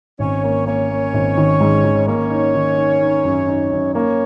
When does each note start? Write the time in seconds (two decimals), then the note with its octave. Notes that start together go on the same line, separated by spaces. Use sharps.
0.19 G#1 C#4 C#5
0.44 A#3
0.66 A#3 C#4 C#5
0.90 A#3
1.13 G#1
1.37 D#3
1.60 G#2
1.84 D#3
2.07 A#3 C#4 C#5
2.30 D#4
2.54 D#3
2.77 D#4
3.01 D#4
3.25 F#2
3.48 D#4
3.72 F#2
3.94 A#3 C#4 C#5